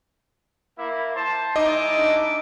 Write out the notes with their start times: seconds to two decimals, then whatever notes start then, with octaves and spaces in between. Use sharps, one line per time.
0.78 A#3 E4
1.15 C5 A5
1.56 G#3 D#4 E4 D#5 D6
1.99 D4